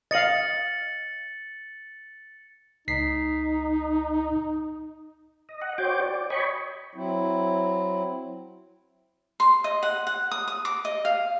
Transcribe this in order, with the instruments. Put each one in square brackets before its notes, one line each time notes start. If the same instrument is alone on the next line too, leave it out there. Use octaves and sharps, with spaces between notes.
[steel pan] D#5 F5 [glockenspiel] A6 C#7 F#7
[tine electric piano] C#2 B6 C7 [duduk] D#4
[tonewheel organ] D#5
D#5 F#5
F#4 C5 C#5 G5 D6
D5
C#5 D#5 G5 G#5 B5 C#6
[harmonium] F#3 C4 E4
[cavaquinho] C6
D#5
F#5
F#5
D#6
D#6
D6
D#5
F5